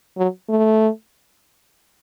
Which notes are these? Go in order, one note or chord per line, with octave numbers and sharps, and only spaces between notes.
F#3
A3